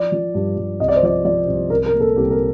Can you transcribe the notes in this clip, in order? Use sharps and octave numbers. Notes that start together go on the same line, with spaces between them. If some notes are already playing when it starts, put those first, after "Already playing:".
Already playing: F3 D5
F3
G2
G2
C2 D#5
D5
C5
F3 D5
F3 D5
C2
C2 A#4
A#4
A#2
A4
C2 G4
A#4